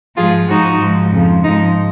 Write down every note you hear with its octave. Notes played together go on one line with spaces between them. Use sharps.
G#2 F3 F4 G#4
G#2 F3 D#4 F#4
G#2 F3
F2 C#3 F3
G#2 F3 D#4